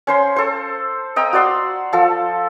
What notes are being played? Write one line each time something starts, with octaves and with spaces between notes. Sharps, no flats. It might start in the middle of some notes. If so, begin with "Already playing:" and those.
C#4 C5 C6
A4 C5
D#5 G5 A#5
F#4 D5 C6 E6
F3 A4